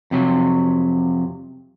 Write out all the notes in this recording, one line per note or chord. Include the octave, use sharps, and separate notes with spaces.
F2 C3 F#3